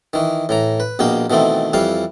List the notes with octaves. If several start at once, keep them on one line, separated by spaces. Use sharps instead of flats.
D#3 E3
A2 E3 A#5
B4
A#1 B2 A#3 G5
B2 D#3 E3 A3 C4
F2 E3 G3 F5